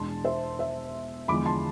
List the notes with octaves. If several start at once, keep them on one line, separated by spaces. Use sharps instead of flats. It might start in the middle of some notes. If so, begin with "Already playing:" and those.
Already playing: E2 B2 G#3 D4 A5 C6
C5 E5
C5 E5
E2 D3 F3 G#3 B5 D6
A5 C6